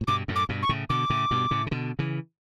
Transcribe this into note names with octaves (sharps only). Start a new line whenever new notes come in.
A2
G2 B2 D6
F#2 A2
D6
G2 B2
C#6
A2 C#3
B2 D3 D6
A2 C#3
G2 B2
A2 C#3
C#3
B2 D3
C#3 E3